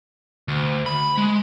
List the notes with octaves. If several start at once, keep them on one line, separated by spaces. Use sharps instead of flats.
D2
B5
G#3